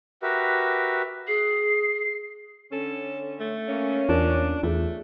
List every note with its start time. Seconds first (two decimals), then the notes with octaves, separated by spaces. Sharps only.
0.22 F#4 G4 A#4 B4 E5
1.27 G#4 C7
2.72 D3 C#4 A4
3.40 A3
3.68 A#3 C#4
4.09 E2 D4 F4 A#4
4.63 E2 A3 F4 G#4